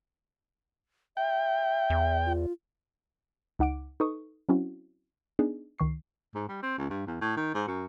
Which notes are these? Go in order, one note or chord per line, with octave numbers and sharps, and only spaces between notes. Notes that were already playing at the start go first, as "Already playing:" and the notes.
E5 G5
E2
F4
C#2 D#4 F#5 D6 D7
D#4 A4 B4 C#6 D#6
F#3 C4 C#4 E4 F#4
B3 D4 D#4 G#4
C#2 D#3 C#6 C7
G#2
G3
C4
C#2
G2
E2
A2
D#3
G#2
F#2